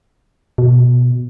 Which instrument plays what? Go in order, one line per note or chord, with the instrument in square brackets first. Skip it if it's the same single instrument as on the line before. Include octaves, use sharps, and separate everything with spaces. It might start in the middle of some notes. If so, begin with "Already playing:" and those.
[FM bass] B2